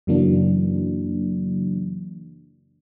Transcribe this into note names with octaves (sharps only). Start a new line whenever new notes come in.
F#2 C#3 E3 F#3 A#3 D4